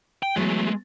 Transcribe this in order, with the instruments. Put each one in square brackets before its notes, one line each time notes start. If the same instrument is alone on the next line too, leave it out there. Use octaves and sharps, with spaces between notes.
[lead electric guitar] G5
[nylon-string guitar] E3 F#3 B3 [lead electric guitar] G#3 A3